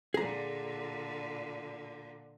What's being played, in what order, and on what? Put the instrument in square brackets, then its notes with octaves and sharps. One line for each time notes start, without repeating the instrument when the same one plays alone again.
[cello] A#2 D3 [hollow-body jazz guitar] G#4 A#5